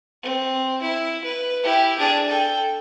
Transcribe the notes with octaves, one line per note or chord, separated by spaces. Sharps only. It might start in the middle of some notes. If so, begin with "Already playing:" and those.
C4
E4
B4
E4 G4
D4 G#4
A4 G5